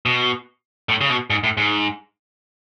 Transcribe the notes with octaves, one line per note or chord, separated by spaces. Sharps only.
B2
A2
C#3
B2
G#2
A2
G#2